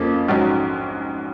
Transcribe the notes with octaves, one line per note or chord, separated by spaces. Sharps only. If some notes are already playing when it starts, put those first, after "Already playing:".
Already playing: F2 C#3 F3 A#3
A#1 G#2 F#3 C#4